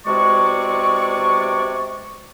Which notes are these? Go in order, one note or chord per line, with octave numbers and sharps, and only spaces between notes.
E2 C3 G#3 F#4 D5 C#6